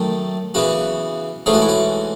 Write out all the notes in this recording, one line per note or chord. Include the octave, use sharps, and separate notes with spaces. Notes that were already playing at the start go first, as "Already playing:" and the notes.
Already playing: F#2 D#3 A3 A4
C#3 E3 B3 F#4
G#2 E3 A3 C#4 G#4
F#4
E4
F#4